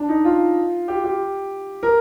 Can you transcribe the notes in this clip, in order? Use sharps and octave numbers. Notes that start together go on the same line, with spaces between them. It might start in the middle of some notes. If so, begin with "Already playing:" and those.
Already playing: D4
D#4
F4
G4
G4
A#4